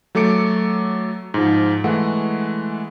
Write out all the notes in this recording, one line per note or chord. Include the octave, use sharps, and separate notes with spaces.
F#3 A3 A4 D6 C#7 D7
G#2 F3
E3 G#3 A3 F#5